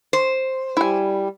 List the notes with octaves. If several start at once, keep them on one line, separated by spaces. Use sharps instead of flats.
C5
G3 E4 G#5